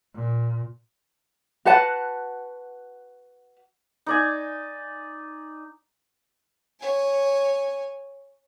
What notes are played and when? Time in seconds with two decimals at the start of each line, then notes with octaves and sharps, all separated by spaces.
0.14 A#2
1.65 F#4 B4 F#5 A5
4.06 D#4 D5 G#5
6.80 C#5 G#5